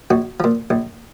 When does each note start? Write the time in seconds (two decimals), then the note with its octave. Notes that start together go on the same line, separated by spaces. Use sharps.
0.10 A#1 F#4
0.40 A#2 F3
0.70 A#1